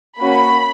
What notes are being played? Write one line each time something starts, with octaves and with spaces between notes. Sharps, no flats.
A#3 C#4 F#4 B5